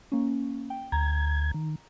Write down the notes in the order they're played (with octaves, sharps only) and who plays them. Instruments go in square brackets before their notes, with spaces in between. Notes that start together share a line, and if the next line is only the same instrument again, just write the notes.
[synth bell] A#3 C#4
G5
[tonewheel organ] D2 G#6 [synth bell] A#5
[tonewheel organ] D#3